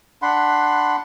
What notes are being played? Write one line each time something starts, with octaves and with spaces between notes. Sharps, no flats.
D4 F#5 B5 C6